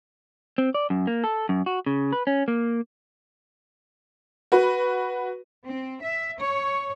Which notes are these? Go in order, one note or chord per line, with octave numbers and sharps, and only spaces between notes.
C4
D5
F#2
A#3
A4
F#2
F#4
C#3
B4
C#4
A#3
F#4 B4
C4
E5
C#5